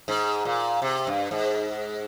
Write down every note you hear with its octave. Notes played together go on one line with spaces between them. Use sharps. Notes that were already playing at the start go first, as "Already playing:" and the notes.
G#2
A#2
C3
G2
G#2